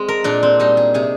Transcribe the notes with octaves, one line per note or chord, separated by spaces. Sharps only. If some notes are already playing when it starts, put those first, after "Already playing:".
Already playing: G#3 C4
A#4
A#2 D4
C4
G3 D#4
G#4
C3 G#4